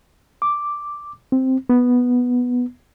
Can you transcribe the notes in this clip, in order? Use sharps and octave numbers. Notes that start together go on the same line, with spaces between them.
D6
C4
B3